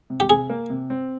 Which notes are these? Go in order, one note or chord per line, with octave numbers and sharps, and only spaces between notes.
C3
G4
C3 G#4
A#3
C3
C4